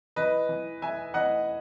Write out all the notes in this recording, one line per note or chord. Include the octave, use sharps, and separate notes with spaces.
E3 B4 D#5
E3
E3 E5 G#5
E3 D#5 F#5